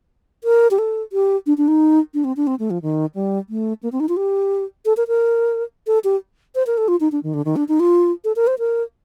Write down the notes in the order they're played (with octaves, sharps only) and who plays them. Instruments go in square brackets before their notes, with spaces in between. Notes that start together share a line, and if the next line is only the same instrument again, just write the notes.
[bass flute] A#4
G4
A4
G4
D4
D4
D#4
D4
C4
D4
C4
A3
F3
D#3
G3
A3
A#3
C4
D#4
F4
G4
A4
A#4
A#4
A4
G4
C5
A#4
A4
F4
D#4
D4
D#3
D3
D#3
D4
D#4
F4
A4
A#4
C5
A#4